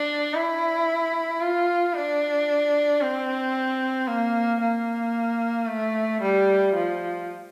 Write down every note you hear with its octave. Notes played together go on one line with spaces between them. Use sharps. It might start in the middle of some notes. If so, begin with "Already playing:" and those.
Already playing: D4
E4
F4
D4
C4
A#3
A#3
A3
G3
F3